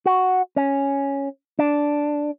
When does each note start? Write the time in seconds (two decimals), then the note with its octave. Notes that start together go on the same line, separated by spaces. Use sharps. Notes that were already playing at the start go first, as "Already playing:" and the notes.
0.06 F#4
0.56 C#4
1.59 D4